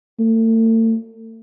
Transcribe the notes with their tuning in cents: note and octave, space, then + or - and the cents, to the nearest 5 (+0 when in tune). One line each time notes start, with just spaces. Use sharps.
A3 +40